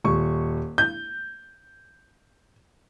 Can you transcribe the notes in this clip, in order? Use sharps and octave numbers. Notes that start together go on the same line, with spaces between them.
D#1 C#6
G6